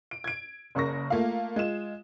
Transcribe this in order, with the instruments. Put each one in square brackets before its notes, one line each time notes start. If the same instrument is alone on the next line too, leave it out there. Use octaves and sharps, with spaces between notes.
[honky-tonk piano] D7
G#6 D7
F#1 C#3 A#4 C#6 A#6
A3 A#3 F4 F5
G#3 F4 E7